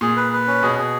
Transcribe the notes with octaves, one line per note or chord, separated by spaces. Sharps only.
A#2 G#4
B4
B4
C#4
B2 G#4
G#4